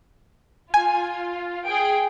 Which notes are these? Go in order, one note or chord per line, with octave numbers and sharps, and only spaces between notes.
F4 G#5
G#4 G5 D7